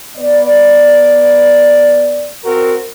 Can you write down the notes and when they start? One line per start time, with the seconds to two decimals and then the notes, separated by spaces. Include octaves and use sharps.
0.17 B3 D5
2.44 C4 F#4 A#4